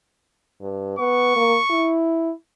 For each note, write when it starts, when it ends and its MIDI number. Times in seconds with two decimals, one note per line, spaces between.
0.61 0.97 43
0.99 1.33 59
0.99 1.94 85
1.36 1.57 58
1.70 2.31 64